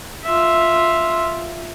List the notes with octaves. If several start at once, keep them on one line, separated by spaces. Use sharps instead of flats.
F4 E5